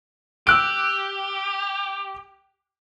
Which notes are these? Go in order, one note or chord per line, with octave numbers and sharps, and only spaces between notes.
G4 E6 F#6 D7